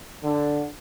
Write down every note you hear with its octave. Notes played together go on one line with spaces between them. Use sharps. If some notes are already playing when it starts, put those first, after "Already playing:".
D3